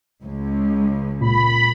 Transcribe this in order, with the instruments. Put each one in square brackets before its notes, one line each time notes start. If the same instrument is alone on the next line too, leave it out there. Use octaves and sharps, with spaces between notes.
[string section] C#2
[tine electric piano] A#2 [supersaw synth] B5